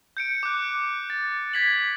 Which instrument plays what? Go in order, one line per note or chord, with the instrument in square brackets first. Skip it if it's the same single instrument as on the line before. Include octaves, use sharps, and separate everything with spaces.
[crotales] G6 C#7 D7
D6 F#6
A6
G#6 B6 F#7